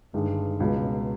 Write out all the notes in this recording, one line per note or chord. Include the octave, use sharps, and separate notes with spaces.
G1 G2 D#3 G#3
C#2 B2 G#3